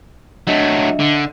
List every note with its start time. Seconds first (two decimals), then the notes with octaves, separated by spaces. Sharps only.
0.47 F#3 A3 D4 D#5 E5
1.00 D3